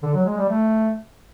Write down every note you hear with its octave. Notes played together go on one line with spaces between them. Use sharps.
D3
F#3
G#3
G3
A3